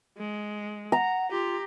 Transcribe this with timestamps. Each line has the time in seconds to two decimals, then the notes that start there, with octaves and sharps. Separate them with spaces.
0.18 G#3
0.92 F#5 A#5
1.31 F4 G4